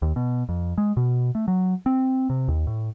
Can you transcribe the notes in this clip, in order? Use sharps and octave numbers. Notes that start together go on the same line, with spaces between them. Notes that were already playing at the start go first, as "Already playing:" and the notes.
D#2
B2
F2
G#3
B2
A3
F#3
C4
C3
D#2
A2